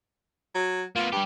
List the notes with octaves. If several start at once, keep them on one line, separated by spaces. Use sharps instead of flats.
F#3
A#3 B3 F4
G2 G3 G4